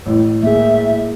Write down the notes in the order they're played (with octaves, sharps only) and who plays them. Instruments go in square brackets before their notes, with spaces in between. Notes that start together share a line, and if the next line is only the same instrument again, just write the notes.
[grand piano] A1 A2
[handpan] A#3 G#4 [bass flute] E5